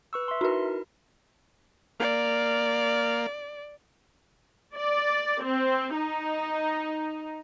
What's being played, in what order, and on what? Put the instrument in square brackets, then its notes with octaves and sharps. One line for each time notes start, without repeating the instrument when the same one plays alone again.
[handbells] B4 C#6 E6
E5 C6
[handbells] D#4 E4 A#4 [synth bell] F#4 B4
[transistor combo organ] A#3 F5 [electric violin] D5
[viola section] D5
C4
D#4